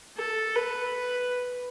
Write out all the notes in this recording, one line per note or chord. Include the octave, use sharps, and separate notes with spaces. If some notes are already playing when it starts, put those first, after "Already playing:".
A4
B4